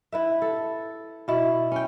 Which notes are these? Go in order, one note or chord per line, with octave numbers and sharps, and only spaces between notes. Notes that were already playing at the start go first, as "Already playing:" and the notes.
E4 B4 E5
A4
B2 E4
C#4 G5